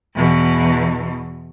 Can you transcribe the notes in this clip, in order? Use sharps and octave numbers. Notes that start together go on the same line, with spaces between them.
E2 B2